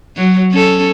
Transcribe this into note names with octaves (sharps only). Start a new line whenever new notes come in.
F#3
C#4 A4